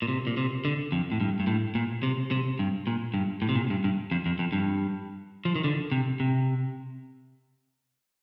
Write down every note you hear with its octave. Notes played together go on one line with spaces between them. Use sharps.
A#2
C3
A#2
C3
D3
F2
A2
G2
G2
A2
A#2
C3
C3
G2
A#2
G2
A2
C3
A#2
G2
G2
F2
F2
F2
G2
F3
D#3
D3
C3
C3